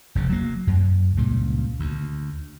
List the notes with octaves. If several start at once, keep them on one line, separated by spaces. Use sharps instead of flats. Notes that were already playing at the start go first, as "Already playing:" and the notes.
F1 C#3
F#3 A#3
F#2
C#2 G2 A#2 C#3
D2